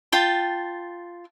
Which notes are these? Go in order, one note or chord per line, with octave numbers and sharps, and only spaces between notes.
F4 G5 A5